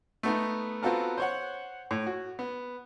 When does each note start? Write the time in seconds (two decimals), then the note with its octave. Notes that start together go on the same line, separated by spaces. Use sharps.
0.23 A3 B3 D#4
0.83 B3 C4 F4 F#4 A4 A#4
1.17 C5 C#5 F#5
1.91 A2
2.07 F#4
2.39 B3